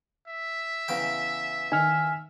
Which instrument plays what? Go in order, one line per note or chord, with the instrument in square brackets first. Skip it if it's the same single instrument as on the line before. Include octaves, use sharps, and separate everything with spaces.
[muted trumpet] E5
[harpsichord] E2 C#3 G5
[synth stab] D#3 [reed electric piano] G#5 F6